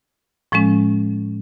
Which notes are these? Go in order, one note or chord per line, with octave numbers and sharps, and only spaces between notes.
A2 F3 G#3 C#4